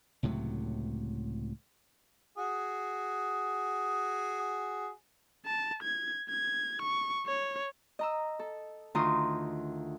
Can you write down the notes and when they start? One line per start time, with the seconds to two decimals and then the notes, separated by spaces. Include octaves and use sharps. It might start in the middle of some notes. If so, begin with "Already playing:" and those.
0.23 C#2 A2 C3 F#3
2.38 F#4 G#4
5.46 A5
5.84 G#6
6.30 G#6
6.83 C#6
7.27 C#5
7.99 D#5 A#5 E6
8.39 A4
8.95 D2 D#3 F4 A#5 C6 D#6